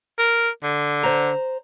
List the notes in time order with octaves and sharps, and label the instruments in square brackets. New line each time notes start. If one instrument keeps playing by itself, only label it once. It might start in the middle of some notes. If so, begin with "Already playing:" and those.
[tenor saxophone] A#4
D3
[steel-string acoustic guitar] C5 A#5